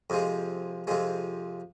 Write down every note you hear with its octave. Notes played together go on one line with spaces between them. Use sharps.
F2 C3 F3 G#3
F2 C3 F3 G#3